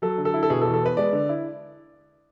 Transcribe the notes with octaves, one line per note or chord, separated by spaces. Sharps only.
F#3 A4
D3
A4
E4
A4
B2 G#4
A4
E2
A4
B3 B4
G#3 D5
D3
E4